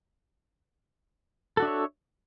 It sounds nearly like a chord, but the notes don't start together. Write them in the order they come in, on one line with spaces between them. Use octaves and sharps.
A4 F#4 D4 E5 C#5